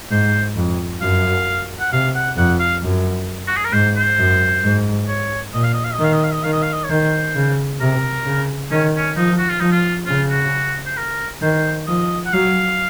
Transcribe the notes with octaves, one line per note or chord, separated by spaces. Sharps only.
G#2 C5
F2
F#2 F5
F#5
C3 F5
F#5
F2 F#5
F5
F#2
F#4
G#4
A#4
G#2 C5
C5
F#2
G#2
C#5
A#2 D#5
F5
D#5
F5
D#5
D#3 F5
D#5
F5
D#5
D#3 F5
D#5
F5
D#5
C#5
D#3 C5
C#3
C3 A#4
C#3
D#3 C#4
C#4
F3 D#4
F#4
F4
F3 D#4
F4
C#3 F4
F#4
C5
A#4
D#3 C5
F3 D#5
F#5
F#3 F5